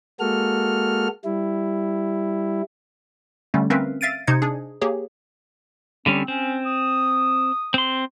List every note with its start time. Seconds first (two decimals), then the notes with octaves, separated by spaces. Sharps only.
0.20 G#3 A#3 F#4 A4 F6
1.24 G3 E4
3.54 D3 G3 A3 C#4
3.70 C4 C#4 A#4 B4 E5 F5
4.01 E5 F5 A6 D7 D#7
4.27 C3 D#4 C5 D#5 G#6 C#7
4.42 D4 G#4
4.81 A#3 G4 G#4 C#5
6.06 D3 G3 C4 C#4
6.28 C4 C#4
6.66 D#6
7.74 C4 C6